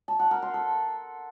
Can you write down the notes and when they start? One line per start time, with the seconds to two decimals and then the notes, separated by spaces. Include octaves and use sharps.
0.08 A5
0.19 F#5
0.31 A#4
0.42 C6
0.54 A4